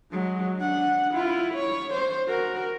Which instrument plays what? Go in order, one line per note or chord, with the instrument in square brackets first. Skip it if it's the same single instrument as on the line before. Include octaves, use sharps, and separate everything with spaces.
[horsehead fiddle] F#3 G#3
D4 F#5
E4 F4
C#5
C5
F#4 A#4